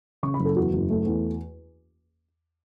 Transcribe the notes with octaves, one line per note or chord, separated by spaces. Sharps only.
C#3 C#6
B5
F#1
A4
E2 F#4
F#1
A3
E2